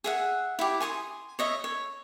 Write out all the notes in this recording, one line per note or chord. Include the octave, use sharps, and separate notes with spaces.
G#4 E5 F#5
E4 G4
G#5 C6 C#6 D#6
C#5 D#5 E5
C#5